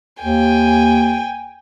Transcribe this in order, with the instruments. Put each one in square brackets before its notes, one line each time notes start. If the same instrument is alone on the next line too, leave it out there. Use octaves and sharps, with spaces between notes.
[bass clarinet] D#2 [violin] G5 G#5